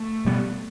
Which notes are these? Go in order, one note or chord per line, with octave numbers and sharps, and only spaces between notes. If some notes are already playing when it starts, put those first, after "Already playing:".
Already playing: A3
B2 G3 B3